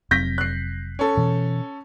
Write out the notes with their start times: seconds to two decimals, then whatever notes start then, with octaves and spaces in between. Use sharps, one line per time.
0.11 F1 F#3 C4 G6 A#6 B6
0.38 F#6 C7
0.99 C#4 A4
1.17 B2 E3